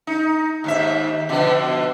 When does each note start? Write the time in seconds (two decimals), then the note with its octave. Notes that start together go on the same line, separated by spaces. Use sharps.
0.07 D#4
0.64 D#2 G#2 E5
1.29 B2 D3 F3